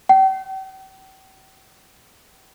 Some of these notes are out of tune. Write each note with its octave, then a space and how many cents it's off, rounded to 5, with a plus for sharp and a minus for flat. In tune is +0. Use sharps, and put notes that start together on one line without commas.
G5 -40